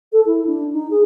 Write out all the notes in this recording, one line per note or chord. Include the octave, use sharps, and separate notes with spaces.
A4
E4
D4
D#4
G#4